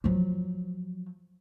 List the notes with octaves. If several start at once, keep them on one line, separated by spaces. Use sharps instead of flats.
F3 F#3